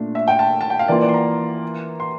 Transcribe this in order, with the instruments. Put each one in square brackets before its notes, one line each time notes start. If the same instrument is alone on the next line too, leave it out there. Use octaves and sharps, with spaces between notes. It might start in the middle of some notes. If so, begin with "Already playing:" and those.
Already playing: [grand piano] A#2 A3 D4
[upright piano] E5
G5
A5
A5
G5
F5
[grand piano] E3 A#3 F4 [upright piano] D5
[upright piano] D5
C6
A#5
C6